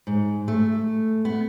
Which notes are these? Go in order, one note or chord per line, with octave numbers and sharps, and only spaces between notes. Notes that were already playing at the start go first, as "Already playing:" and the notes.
G#2
A3
B3